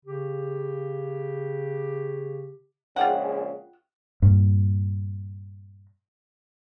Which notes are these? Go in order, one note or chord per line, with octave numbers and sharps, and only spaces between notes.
C#3 G4
A#1 C#3 G#3 F4 G4 F#5
G2 A#2